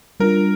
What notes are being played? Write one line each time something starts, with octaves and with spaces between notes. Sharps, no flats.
G3 D4 F4 A#4